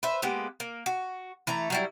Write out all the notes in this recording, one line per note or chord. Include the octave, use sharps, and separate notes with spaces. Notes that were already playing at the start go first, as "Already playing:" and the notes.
B4 C5 E5
G#3 A#3 B3 G4
A#3
F#4
E3 A3 A#5
F#3 G3 E4